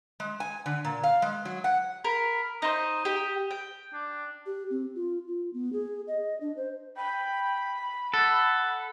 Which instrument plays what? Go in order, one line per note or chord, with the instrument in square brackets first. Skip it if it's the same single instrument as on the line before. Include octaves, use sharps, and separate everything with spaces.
[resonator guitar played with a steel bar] G#3
G#5
D3
A#2
F5
G#3
F#3
F#5
[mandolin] A#4 [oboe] B5
[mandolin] D#4 C5 [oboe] D#6
[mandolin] G4
G5
[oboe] D4
[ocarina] G4
C4
F4
F4
B3
G#4
D#5
D4
C5
[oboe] G5 [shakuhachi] B5
[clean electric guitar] A4 [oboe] F#5